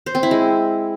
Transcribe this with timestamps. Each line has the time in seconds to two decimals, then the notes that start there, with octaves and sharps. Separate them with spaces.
0.06 C5
0.15 C4
0.23 E4
0.31 G#3